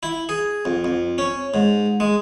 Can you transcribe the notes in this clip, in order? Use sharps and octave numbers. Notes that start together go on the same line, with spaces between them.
E4
G#4
F2
F2
C#4
G#2
G#3